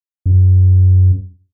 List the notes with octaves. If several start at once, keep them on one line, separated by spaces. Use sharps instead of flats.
F#2